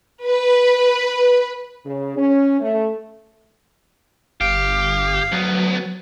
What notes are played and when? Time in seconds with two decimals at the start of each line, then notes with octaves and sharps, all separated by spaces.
0.24 B4
1.85 C#3
2.17 C#4
2.60 A3
4.41 G1 G4 F5
5.32 D2 F#3 B3